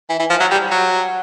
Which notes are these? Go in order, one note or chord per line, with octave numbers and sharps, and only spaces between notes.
E3
E3
F3
F#3
G3
F#3